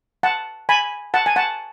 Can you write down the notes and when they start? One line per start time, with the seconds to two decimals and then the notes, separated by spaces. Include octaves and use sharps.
0.23 F#5 A5
0.69 G#5 B5
1.14 F#5 A5
1.26 G#5
1.36 F#5 A5